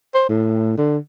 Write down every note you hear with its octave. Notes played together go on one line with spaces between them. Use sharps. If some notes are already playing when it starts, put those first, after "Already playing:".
C5
A2
D3